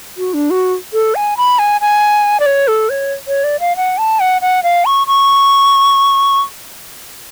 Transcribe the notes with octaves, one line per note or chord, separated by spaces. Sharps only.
F#4
D4
F#4
A4
G#5
B5
G#5
G#5
D5
C#5
A4
C#5
C#5
D5
F5
F#5
A5
F#5
F#5
F5
C#6
C#6